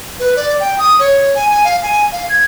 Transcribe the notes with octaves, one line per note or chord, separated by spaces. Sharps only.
B4
D5
G5
D#6
C#5
G#5
G#5
F5
G#5
F5
G#6